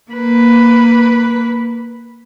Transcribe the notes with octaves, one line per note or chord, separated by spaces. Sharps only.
A#3 B4